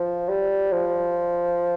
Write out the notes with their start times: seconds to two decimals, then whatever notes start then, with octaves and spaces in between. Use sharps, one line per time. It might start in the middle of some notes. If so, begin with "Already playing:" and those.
Already playing: F3
0.29 G3
0.73 F3